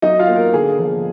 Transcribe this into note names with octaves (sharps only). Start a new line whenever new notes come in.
F#3 D#4 D#5
F4 F5
A#3
A#4
D3 G#4
F3